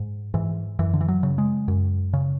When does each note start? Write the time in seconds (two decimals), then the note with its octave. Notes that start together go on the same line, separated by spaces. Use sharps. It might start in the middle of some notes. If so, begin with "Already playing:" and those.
Already playing: G#2
0.34 G#2 E3
0.79 F#2 E3
0.94 D3
1.01 E3
1.08 F#3
1.23 C#3
1.38 G#3
1.68 F#2
2.13 C#3